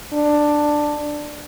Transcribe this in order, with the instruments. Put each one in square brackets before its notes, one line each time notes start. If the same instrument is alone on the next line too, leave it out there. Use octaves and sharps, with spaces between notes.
[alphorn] D4